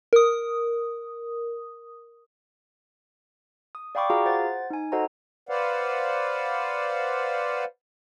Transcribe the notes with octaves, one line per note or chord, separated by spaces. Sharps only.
A#4 D#6
D#6
D5 F5 G5 B5 C#6 D6
F4 F#4 G#4 F5 A#5
C5 F#5 A6
D#4 G#5
F#4 A4 C5 D#5 F#5 A#5
B4 C5 D5 F5 F#5